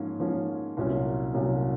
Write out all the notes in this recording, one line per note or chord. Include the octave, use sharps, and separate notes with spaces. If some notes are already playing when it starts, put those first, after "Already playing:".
Already playing: G#2 F3 A#3 C#4
G#2 F3 A#3 C#4
C2 A#2 F#3 C#4
C2 A#2 F#3 C#4